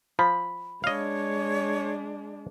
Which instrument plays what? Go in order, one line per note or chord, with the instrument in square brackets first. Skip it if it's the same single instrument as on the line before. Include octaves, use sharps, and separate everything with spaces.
[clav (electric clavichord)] F3 [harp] B5
[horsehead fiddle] G#3 D4 [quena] C#5 [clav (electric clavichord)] D#5 F5